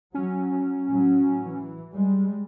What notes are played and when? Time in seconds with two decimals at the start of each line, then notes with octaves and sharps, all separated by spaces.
0.14 F#3 C#4
0.88 A2 F#3
1.41 E3
1.93 G3 G#3